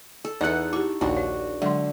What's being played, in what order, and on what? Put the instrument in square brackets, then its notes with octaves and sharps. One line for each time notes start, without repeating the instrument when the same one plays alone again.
[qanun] A4
[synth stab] E2 F#5 [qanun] D#4 A4
[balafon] E4 G4 [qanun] C#6
[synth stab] A#1 D#2 [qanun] D4 F#4
[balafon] C#5
[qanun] D3 [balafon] F#3 G#3 C6